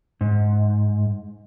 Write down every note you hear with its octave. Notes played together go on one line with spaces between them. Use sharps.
G#2